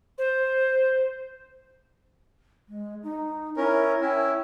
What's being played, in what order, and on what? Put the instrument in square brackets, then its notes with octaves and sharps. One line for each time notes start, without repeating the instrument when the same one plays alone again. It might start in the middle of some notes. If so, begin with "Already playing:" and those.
[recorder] C5
[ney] G#3
D#4
[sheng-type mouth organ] C#4 A#4 [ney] E4
[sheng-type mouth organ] C#4 E4 [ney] G5